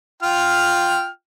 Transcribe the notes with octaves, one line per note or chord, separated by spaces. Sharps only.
F4 G5 F6